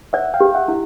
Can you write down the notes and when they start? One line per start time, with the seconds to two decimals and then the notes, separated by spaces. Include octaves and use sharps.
0.13 D5 E5 F#5
0.34 F5 G5
0.40 G4
0.54 E5 F#5
0.68 E4